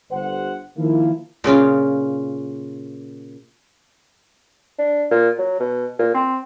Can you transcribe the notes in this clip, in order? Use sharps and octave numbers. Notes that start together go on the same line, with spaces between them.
G1 C5 F#5
D#3 F3 A#3 E4
A#2 C#3 C#4 F4
D4
A#2
F#3
B2
A#2
C4